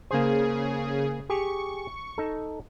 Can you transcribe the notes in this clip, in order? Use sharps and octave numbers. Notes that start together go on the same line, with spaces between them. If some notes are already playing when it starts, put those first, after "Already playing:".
C#3 A#3 G#4 C5
G4 G#4 C#6
D#4 A4